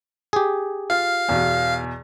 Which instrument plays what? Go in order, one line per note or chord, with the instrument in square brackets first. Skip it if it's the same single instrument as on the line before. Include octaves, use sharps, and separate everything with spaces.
[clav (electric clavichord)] G4 G#4
[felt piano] F4 [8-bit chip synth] F5
[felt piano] E2 B2